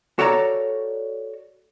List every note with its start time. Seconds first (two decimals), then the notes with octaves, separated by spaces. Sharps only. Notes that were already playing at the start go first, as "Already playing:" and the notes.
0.19 F#4 A4 C#5 D5 A#5